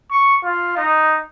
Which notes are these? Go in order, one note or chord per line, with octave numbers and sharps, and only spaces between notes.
C#6
F4
D#4